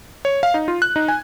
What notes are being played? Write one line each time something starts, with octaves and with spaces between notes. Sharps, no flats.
C#5
F5
D#4
F4
F#6
D#4
G#5